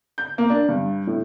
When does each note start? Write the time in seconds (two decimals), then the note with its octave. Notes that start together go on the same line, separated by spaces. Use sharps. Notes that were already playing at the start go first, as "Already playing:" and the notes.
0.18 G6
0.38 A#3
0.50 D4
0.69 G2
1.07 A2